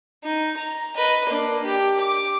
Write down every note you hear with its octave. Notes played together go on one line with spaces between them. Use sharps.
D#4
A#5
B4 D#5
A#3 D4
G4
D6